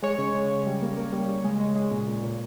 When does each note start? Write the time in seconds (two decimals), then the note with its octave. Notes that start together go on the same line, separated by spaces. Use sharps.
0.03 G#3 C#5
0.18 C#3
0.34 G#3
0.51 C#3
0.66 G3
0.82 A#3
0.97 A#3
1.13 G3
1.29 C#3
1.44 G#3
1.60 G#3
1.76 G#3
1.91 A#2
2.07 A#2
2.23 A#2